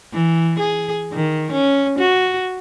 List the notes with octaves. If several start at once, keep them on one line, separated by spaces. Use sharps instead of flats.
E3
G#4
D#3
C#4
F#4